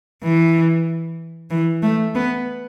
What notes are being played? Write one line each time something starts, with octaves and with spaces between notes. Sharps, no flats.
E3
E3
A3
B3